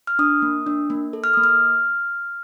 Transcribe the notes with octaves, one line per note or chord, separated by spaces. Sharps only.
F6
D4 D#6
A#3
D4
A#3
A4
F6
A#3 D#6
F6